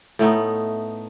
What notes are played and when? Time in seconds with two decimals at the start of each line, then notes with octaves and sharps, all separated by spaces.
0.19 A2 A3 B3 D#4